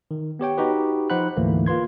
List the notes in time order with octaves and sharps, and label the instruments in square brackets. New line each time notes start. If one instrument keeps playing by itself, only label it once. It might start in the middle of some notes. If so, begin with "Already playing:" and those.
[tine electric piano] D#3
B3 G4 C#5 G5
D#4 F#4 G4 B4
F3 D#4 C5 F#5 B5 F#6
D2 G#2 E3 A3 A#3
A#3 F4 B4 C6 G#6